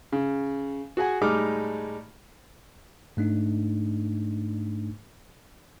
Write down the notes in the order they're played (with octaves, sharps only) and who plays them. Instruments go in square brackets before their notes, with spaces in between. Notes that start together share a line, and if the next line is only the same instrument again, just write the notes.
[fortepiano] C#3
F#4 G#4 F#5 G#5
A2 G3 G#3 D#4 D6 F6
[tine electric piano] G#2 A3 D4 D#4